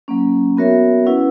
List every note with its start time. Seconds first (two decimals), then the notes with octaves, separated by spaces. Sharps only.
0.08 F#3 A#3 C#4
0.57 B3 F#4 A#4 C#5 E5
1.06 C#4 E4 B4 F#5